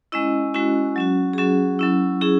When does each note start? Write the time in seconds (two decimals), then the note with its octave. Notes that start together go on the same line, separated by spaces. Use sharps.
0.12 G#3 C#4 E4 D#5
0.54 G#3 C#4 E4 F#4
0.96 F#3 C#4 F#4
1.33 G#4
1.38 F#3 C#4 F#4
1.79 F#3 C#4 E4
2.21 F#3 C#4 E4 G#4